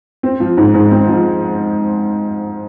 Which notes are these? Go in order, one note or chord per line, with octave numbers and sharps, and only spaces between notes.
C4
F3
G#2
G#2
C4
F3